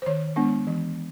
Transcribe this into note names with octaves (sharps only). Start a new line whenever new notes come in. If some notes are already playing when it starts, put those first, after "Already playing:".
C5
D#3 C#5
G#3 B3 D4
E3